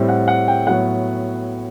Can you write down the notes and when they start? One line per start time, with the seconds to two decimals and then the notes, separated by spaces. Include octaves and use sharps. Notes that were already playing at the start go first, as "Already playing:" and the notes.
Already playing: A2 G3 C4
0.09 F#5
0.28 F#5
0.48 G5
0.66 A2 F#3 B3 F#5